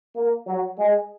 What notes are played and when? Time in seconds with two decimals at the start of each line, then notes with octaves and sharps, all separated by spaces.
0.15 A#3
0.46 F#3
0.77 G#3